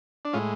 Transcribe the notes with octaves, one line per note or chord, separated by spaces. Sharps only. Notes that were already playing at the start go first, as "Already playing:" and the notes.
D4
A2 G#3 C#4 F4